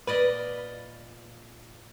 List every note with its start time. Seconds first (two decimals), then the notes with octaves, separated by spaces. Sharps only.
0.07 A#2 B4 D5 D#5